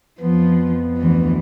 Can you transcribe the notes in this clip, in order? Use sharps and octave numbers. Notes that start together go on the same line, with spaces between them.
F2 F3 B3
D2 E3